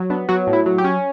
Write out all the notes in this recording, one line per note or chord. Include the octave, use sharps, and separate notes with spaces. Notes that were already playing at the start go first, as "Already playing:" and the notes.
Already playing: F#3
B3 D4
F#3 F#4
A2
E4
F#3
G4
C#4